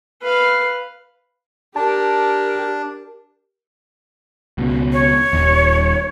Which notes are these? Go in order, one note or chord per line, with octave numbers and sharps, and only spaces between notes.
B4 F5
D4 G4 A#4 A5
C#2 B2
C#5
D#1 D#2